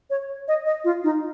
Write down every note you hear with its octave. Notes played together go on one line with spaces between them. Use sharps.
C#5
D#5
D#5
F4
D#4